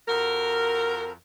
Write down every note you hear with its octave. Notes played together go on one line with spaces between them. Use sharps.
F2 F#4 A#4